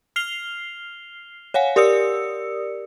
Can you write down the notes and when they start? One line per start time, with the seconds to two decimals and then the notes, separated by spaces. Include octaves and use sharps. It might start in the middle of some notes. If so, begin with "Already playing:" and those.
0.16 F6 C7 F7 G7
1.54 C#5 F5 F#5 G#5
1.76 G4 A#4 D5 D#6 E6 C#7